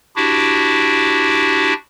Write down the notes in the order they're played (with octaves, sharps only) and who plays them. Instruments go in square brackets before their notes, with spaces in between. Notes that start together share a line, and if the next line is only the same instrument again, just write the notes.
[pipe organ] D4 E4 F#4 G4